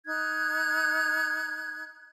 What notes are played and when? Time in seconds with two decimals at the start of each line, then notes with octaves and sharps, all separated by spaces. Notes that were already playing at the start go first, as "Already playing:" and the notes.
0.06 D#4 F#6 G#6